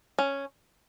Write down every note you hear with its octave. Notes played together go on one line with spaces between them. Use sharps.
C#4